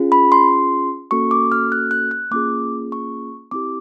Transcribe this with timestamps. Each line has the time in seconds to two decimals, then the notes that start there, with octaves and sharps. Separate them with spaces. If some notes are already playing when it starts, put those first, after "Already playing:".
Already playing: C#4 F4 G#4
0.12 B5
0.32 C6
1.11 A#3 C#4 F#4 A4 C#6
1.31 D6
1.52 F6
1.72 F#6
1.91 F#6
2.11 F#6
2.31 A#3 C#4 F4 G#4 D6
2.92 C#6
3.51 C4 E4 G4 D6